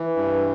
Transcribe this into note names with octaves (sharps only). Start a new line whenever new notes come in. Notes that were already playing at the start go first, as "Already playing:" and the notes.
Already playing: E3
G2